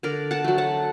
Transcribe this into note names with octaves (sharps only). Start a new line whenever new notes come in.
D3 A#4 D5
F#5 A5
F#3 A3
F#5 A5